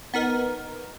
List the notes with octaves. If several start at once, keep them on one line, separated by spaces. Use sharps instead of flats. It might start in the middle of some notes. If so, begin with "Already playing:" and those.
B3 D#4 A#4